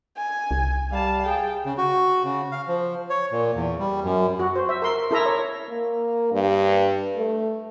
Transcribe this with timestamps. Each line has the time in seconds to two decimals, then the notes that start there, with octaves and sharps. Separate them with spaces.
0.17 G#5
0.51 C2
0.92 G3 F5 A5
1.26 G#4 G5
1.64 C#3
1.78 F#4
2.24 C#3
2.52 F5
2.68 F3
3.10 C#5
3.32 A#2
3.55 E2
3.79 G3
4.04 F#2
4.39 F#4
4.56 C5
4.69 E5
4.82 A#4 C6
5.11 E4 A4 A#4 E5 A#5
5.26 C#5
5.70 A#3
6.32 G2
7.16 A3